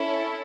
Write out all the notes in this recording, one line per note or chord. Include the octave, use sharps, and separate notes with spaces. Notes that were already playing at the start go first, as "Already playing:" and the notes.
Already playing: C#4 E4 A4